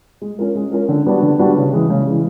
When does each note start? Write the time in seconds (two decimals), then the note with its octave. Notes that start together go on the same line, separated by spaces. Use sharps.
0.22 G#3
0.39 C#4 F4 A#4
0.55 G#3
0.72 C#4 F4 A#4
0.89 D3
1.06 G3 B3 D4 F#4
1.23 D3
1.39 G3 B3 D4 F#4
1.57 C#3
1.73 E3 G#3
1.90 C#3
2.07 E3 G#3